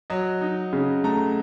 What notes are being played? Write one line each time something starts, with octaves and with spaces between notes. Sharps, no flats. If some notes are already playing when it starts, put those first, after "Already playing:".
F#3 D#5
D#4
C#3
A3 A#5